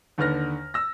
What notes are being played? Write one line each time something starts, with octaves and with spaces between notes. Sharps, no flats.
D#2 D3 B4 F6 A#6
E6 A#6